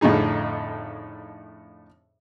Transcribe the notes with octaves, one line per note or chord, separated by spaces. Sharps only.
F2 A2 D3 D#4 G#4